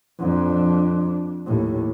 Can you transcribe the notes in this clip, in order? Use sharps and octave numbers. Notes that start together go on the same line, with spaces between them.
F2 D4
D#2 A2